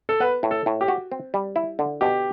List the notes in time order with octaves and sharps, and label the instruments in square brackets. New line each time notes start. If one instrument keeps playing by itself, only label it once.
[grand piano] A4
[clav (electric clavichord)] B3 [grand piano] B4
[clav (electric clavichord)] A2
[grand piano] A4
[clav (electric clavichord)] A2
[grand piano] G4
[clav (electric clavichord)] F#4
C4
G3
E4
D3
[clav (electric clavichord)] B2 [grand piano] G4